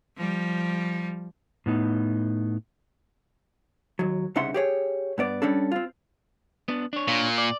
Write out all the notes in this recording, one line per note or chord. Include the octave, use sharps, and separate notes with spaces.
F3 G3
A2 B3 D#4
D#2 F#3
C2 C#3 D#4 E5 F#5 C6
G4 G#4 C#5
G2 B3 D5
G3 C#4 D4 A4
C4 F4
B3 D4
D4 C#5
A#2
D5